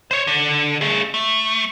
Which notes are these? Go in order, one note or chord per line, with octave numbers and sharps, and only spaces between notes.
C5 C#5
D3
A3 G#4
A3